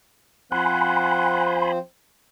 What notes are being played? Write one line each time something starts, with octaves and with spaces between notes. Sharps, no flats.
F3 C4 C5 F#5 G#5 B5 C6